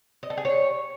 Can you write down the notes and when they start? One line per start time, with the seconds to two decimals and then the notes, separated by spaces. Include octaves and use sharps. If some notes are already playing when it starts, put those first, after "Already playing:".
0.23 D#5
0.30 A4
0.37 G#4
0.45 C#5